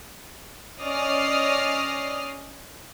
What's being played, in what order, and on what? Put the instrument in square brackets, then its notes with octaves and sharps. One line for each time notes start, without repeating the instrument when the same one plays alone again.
[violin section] C#4 D5 D#5 D#6 F6 C7